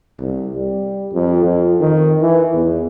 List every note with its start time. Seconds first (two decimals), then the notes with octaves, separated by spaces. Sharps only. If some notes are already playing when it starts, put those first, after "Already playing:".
0.19 C2
0.54 G3
1.12 F2
1.44 F2
1.80 D#3
2.21 E3
2.54 E2